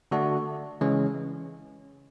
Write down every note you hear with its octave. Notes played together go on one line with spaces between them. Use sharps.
D3 A3 D4 F#4
C#3 E3 G#3 C#4